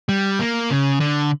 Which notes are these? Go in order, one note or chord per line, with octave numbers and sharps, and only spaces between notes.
G3
A#3
C#3
D3